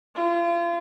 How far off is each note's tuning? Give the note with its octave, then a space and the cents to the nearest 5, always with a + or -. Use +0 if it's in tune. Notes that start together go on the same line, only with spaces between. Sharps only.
F4 -35